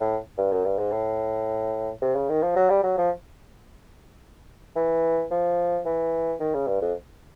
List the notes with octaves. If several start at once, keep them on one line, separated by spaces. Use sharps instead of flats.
A2
G2
F#2
G2
G#2
A2
C3
C#3
D#3
F3
F#3
G3
F#3
F3
E3
F3
E3
D#3
C#3
G2
F2